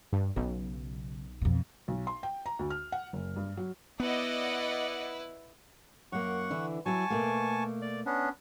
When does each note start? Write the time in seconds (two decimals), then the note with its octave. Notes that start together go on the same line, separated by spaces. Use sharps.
0.13 G2
0.36 B1 C#3
1.41 F2 B2
1.88 B1
2.07 C6
2.23 G5
2.46 A#5
2.59 D2
2.70 F6
2.92 F#5
3.13 F#1
3.36 G2
3.57 F#3
4.00 B3 E4 B4 D5 D#5 F#5
6.12 F#2 A#3 F#5 C#6
6.50 D3 E3 E4
6.86 F#3 E4 G#5 A5 C#6
7.10 B2 A3 A#3
7.82 D5
8.06 B3 C#4 D4